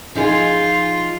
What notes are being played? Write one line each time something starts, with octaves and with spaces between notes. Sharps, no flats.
F3 D#4 F4 G#4